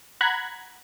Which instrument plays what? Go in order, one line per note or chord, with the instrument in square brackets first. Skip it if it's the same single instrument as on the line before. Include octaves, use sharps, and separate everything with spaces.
[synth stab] F#5 A#5 B5 F#6 G#6